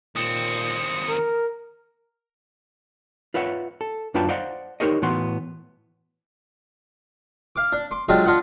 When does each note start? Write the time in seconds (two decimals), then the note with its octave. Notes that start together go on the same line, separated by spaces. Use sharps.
0.16 D#2 A#2 C4 D#6 C#7
1.09 A#4
3.34 F4 B4 C#5 E5 F#5
3.81 A4
4.14 F#2 D4 F4 B4 G5 A5
4.29 C5 D5 D#5 F5 F#5
4.80 D#4 G4 A#4 C5 C#5 D#5
5.02 A2 E3 B3 F#4 C6
7.56 F5 D6
7.72 D4
7.91 C6 D6
8.09 F#3 G#3 D4 F4 G4
8.26 D4 F4 D#5 F#5